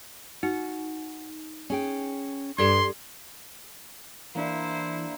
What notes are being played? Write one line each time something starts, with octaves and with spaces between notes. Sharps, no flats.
D#4 F#4
C#4 G#4 G5
G2 G4 A4 C6 G#6
E3 A#3 D4 E4 C5 E5